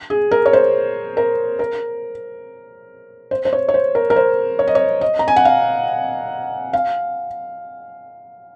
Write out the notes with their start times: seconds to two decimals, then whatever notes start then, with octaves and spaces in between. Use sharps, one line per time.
0.10 G#4
0.31 A#4
0.46 C#5
0.53 C5
1.17 A#4
1.59 A#4
3.31 C5
3.45 C5
3.53 C#5
3.69 C#5
3.74 C5
3.95 A#4
4.10 A#4
4.16 C5
4.59 C#5
4.68 D#5
4.75 C#5
5.01 D#5
5.19 A#5
5.28 G#5
5.36 F#5
5.45 F5
6.73 F5